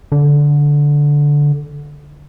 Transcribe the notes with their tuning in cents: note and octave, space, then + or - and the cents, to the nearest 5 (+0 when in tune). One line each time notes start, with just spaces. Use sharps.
D3 -10